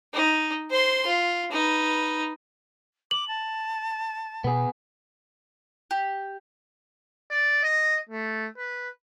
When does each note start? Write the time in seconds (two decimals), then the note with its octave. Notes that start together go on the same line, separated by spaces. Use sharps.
0.14 D#4
0.70 C5 C6
1.06 F4
1.52 D#4 B4
3.11 D6 F#7
3.28 A5
4.44 B2 B3 G#4
5.91 G4
7.31 D5
7.63 D#5
8.09 A3
8.58 B4